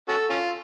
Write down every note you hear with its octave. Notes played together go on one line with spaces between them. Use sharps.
C#4 F#4 A4
C#4 F4